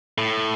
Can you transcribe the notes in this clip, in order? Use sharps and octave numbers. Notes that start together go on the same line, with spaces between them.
A2